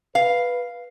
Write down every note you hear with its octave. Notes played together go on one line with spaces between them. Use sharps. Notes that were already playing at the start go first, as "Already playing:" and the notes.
B4 F5